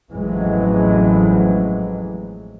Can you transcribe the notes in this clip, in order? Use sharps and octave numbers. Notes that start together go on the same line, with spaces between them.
A1 F2 E3 F#3 G#3